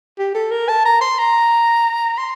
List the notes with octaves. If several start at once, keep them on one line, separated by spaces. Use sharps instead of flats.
G4
A4
A#4
A5
A#5
C6
A#5
C6